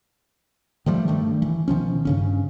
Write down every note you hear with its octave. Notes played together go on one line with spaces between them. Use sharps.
D#3 F3 G3 A3
G2 D#3 A3
E3
B2 D#3 F3 C#4
G2 C#3 C#4